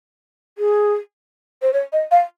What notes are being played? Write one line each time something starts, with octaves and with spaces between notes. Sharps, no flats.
G#4
C5
C#5
D#5
F5